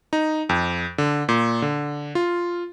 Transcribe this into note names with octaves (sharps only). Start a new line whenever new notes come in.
D#4
F2
D3
A#2
D3
F4